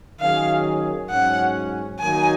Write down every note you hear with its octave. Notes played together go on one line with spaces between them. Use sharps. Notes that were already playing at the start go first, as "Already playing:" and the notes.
D#3 F#3 C#4 G#4 F5
G#2 F#3 C#4 F#5
D#3 F#3 A#3 D#4 G#5